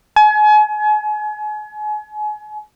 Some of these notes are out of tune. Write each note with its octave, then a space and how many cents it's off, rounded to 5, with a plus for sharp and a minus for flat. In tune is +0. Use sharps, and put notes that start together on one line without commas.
G#5 +35